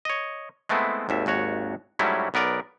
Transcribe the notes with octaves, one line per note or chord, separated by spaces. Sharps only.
C#5 D#5
G#3 A3 B3 C4 E4
G#1 D#2 E5
G#1 D#2 F#4 C#5
G#2 F#3 G3 A3 C#4 E4
B1 B3 A#4 D5